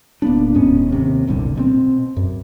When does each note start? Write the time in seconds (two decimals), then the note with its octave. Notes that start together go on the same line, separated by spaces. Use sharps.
0.22 D1 A#3 B3 D4
0.55 D#1 G#2 B3 C#4
0.89 D#2 C3
1.27 F1 C2 A#2 D3
1.56 B2 G#3 C4
2.16 F#2